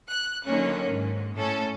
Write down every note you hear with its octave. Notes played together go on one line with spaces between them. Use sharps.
F#6
D3 D#3 F#3 A#3 C#4
G#2
A2 C#4 A4